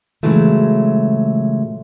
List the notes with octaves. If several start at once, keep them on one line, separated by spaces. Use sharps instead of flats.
A#2 C#3 E3 F#3 G#3 A3